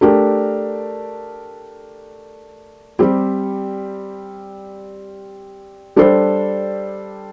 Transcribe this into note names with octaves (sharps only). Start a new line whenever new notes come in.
A3 D4 G4 A#4
G3 C4 G4
G3 D4 A4 C5